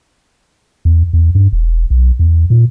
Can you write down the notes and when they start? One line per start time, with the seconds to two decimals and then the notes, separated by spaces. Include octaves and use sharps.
0.85 E2
1.13 E2
1.35 G2
1.52 E1
1.90 B1
2.19 E2
2.50 A#2